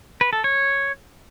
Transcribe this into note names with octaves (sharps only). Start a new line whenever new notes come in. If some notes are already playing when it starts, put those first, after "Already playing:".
B4
A4
C#5